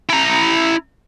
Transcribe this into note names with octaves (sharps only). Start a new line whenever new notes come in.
E4 A#5